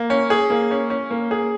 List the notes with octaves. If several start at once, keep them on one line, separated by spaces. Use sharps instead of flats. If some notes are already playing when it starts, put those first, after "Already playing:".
Already playing: A#3
C#4
G#4
A#3
C#4
C#4
A#3
G#4